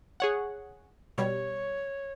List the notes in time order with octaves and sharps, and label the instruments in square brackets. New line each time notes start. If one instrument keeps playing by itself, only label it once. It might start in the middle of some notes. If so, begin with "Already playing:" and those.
[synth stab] G#4 C#5 F#5
[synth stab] B2 G3 [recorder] C#5